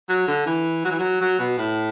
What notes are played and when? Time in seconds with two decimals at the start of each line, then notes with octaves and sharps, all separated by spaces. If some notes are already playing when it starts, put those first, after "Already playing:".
0.09 F#3
0.28 D3
0.46 E3
0.84 F#3
0.91 E3
0.99 F#3
1.21 F#3
1.39 B2
1.58 A2